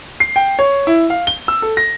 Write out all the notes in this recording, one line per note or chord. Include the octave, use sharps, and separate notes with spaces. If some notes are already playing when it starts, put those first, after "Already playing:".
C7
G5
C#5
E4
F5
G7
E6
A4
A#6